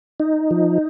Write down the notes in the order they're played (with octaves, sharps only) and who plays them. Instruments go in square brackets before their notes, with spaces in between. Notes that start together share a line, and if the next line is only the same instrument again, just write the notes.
[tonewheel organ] D#4
F3